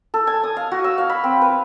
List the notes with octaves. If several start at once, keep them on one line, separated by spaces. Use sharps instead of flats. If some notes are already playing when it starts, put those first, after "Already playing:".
A4
G#5
D#6
F5
F#4
E6
F5
B5
C4
B4